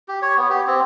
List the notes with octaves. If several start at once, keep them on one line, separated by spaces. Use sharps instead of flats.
G4
C#5
B3
G4
C4